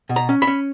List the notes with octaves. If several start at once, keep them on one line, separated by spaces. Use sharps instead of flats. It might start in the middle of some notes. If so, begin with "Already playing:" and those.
B2
A#5
C#4
B5
C#4